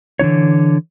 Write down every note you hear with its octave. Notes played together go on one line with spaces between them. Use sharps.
D3 E3 D#4 C#5